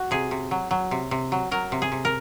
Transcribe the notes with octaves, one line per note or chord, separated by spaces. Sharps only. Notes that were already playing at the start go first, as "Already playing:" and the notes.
Already playing: F#4
C3 G#4
C3
F#3
F#3
C3
C3
F#3
F#3 A#4
C3
G#4
C3
A#4